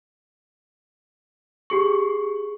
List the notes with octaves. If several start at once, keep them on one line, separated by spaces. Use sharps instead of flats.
G4 G#4 C#6